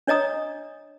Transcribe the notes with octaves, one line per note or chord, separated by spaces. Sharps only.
D4 C#5 D#5 A#5 D#6